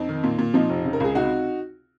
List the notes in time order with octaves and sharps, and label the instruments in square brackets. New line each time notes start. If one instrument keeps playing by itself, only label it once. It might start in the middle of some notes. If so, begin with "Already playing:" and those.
Already playing: [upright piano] F2 C4 D#4
D#3
A#2
A#2
F3 C4 D#4
F1
C#3
A#4
C#2 G#4
C3 D#4 F#4